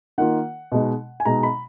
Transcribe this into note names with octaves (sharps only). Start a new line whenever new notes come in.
D#3 A#3 F4 F#5
B2 G#3 D#4
G#5
B2 G#3 D#4 A#5
B5